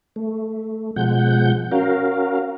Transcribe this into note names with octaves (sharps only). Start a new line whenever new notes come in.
A3
B2 F3 G#3 F#5 G6
C#4 F#4 A#4 F5